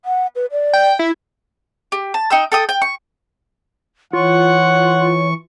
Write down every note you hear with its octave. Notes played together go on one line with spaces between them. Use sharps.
F#5
B4
D5
G5
E4
G4
A5
D#4 G5 E6
A4 G5 D#6
G5
C#6
E3 F4 C#5 F#5 C#6